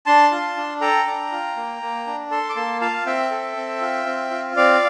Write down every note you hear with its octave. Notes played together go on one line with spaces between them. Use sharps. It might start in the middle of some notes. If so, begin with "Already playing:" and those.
D4 A5 C6
F4
D4
A4 G5 A#5
D4
F4
A#3
A#3
D4
A4 A5 C6
D6
A#3 A5 C6
F4 F5 A5
C4 E5 G5
A4
C4
F4
C4
F4
C4 D5 F5